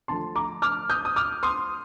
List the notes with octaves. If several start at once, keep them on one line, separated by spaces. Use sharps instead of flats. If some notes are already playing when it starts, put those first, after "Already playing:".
D3 F3 A3 A5 C6
A#5 D6
D6 F6
D#6 G6
D#6
D6 F6
C6 D#6